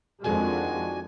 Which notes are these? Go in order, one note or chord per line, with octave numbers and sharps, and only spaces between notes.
F2 D#3 G#3 D4 F#4 G#5